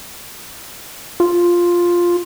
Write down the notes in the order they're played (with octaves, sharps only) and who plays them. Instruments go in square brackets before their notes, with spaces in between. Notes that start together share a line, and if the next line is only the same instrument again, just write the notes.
[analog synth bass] F4